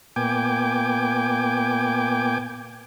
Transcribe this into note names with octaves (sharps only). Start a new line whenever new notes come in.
A#2 B3 G5 G#5 D6